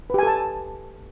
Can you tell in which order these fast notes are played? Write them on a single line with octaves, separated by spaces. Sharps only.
B4 G4 G#5 A4 A5